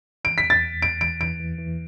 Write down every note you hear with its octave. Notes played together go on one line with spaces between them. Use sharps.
E3 D7
B6
E2
A6
E2
E2 D7
E3 D7
E3 D7
E3
E3